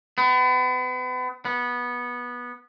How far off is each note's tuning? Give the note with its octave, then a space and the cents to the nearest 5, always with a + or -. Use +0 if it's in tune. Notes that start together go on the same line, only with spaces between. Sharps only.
B3 +35
B3 -15